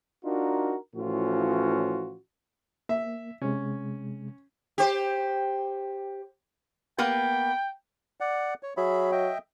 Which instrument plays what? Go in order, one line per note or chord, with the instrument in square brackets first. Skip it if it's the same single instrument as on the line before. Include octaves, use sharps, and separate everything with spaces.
[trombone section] D4 D#4 F4 F#4 A#4
A2 E3 F3 C#4 F4 F#4
[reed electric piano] A#3 [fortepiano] E5
[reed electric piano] C3 G#3 [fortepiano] C#4
[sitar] G4 C5
[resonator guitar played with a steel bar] A#3 B3 B4 [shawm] G5
[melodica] D5 F#5
C#5
[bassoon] F#3 [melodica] G#4 E5 B5
[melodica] D#5 E5 G5